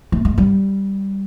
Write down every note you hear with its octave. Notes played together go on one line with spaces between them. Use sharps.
A3
G#3
G3